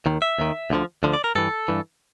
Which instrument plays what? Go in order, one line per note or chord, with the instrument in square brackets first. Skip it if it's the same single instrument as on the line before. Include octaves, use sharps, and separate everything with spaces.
[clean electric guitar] D#2 D#3
E5
D#2 D#3
D2 D3 F3
D2 D3 F3
D5
A#4
G2 E3 A4
G2 E3